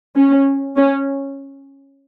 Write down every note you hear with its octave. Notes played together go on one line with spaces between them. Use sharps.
C#4
C#4